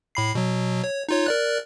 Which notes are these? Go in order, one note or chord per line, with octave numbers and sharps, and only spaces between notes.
A2 B5 C7
B2 F#3
C#5
D#4 F4 C#5
A#4 D5 F#6